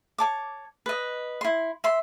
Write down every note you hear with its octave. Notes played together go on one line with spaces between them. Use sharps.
C#5 A5 D6
B4 D#5
E4 C6
E5 C6